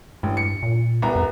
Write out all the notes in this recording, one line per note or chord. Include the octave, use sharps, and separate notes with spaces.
A1 G2
C#7
A#2
C2 B3 A#5
F2